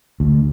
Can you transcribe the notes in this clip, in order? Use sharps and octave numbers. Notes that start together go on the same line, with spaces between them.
D2